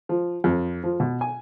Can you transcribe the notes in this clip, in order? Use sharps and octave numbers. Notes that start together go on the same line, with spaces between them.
F3
F2
F3
B2
G#5